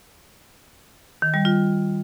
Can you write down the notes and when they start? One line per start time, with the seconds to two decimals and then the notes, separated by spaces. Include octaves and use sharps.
1.22 D#3
1.34 G3
1.45 F4